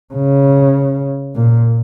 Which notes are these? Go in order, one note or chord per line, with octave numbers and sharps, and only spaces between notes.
C#3
A#2